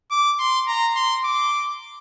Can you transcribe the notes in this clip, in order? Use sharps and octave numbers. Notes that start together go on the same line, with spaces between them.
D6
C6
A#5
C6
D6